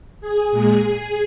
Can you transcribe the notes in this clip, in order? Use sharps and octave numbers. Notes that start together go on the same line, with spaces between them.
G#4
A#2 G#3